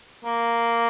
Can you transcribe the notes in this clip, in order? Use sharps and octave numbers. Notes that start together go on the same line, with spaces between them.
A#3